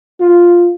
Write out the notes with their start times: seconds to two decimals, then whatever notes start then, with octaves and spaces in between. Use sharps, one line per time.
0.20 F4